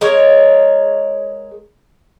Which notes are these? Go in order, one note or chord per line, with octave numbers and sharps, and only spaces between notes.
G#3 A#4 C#5